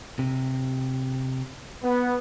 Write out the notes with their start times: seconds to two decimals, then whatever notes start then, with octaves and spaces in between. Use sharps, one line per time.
0.19 C3
1.83 B3